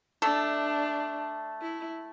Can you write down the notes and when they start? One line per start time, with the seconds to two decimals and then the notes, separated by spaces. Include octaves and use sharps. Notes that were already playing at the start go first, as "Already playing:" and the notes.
0.22 A3 D4 A4
1.62 E4